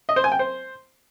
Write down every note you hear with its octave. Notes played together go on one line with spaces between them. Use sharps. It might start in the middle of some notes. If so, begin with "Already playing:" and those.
D#5
C5
G#5
G5
C5